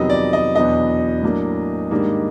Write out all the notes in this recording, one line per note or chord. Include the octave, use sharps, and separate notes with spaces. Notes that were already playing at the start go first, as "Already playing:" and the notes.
Already playing: F2 C3 D#3 F#3 B3 D#5
D5
D#5
E2 B2 F#3 B3 D4 D#5
A2 F#3 A#3 D4
G#2 D#3 G3 A#3 D4